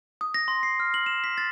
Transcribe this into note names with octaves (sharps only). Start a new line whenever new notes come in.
D#6
A#6
C6
C7
F6
F#7
E7
B6
A6